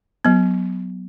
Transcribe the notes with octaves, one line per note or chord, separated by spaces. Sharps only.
F#3 B3